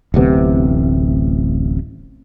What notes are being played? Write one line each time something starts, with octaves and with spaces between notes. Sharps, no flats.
D1 A1 C3 B3